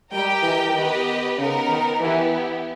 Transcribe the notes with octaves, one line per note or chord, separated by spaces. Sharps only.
G3 G4 A#4 D#5 G5
E3
D#3 B3 G4 B4 D#5
C#3 B3 D#4 A#4
D#3
E3 B3 E4 G4